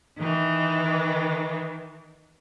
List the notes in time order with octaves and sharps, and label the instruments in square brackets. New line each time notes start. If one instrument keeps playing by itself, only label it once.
[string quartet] D#3 E3